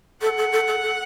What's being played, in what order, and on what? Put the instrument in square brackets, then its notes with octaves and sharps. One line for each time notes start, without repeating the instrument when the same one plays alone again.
[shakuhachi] A4 [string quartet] F#5
[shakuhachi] A4
A4
A4
A4